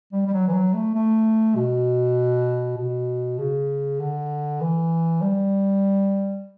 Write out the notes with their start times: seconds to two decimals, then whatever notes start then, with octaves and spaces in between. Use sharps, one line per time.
0.13 G3
0.27 G3
0.34 F#3
0.48 E3
0.54 F#3
0.74 A3
0.95 A3
1.56 B2
2.77 B2
3.39 C#3
4.00 D3
4.61 E3
5.22 G3